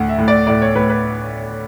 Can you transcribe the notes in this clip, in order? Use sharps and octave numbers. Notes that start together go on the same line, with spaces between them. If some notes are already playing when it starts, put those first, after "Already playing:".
Already playing: D2 A2 F#5
E5
A2
D5
A2 D5
C#5
A2 B4
B4